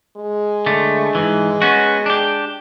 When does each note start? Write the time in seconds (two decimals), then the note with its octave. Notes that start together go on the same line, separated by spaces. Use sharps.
0.17 G#3
0.66 D3 A3
1.15 G#2 E3
1.62 B3 C#4 F#4
2.06 D4 G4